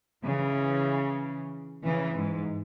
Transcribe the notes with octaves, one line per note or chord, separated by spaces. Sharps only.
C#3 E3
C#3 E3
G#2